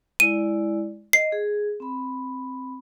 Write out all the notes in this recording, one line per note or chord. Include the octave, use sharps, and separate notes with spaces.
G#3 E4 D5 D#7
D#5 C7
G#4
C4 B5